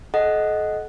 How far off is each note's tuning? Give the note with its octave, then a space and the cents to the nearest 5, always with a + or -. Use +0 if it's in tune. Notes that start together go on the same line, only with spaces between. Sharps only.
A4 -35 D#5 +0 F#5 +0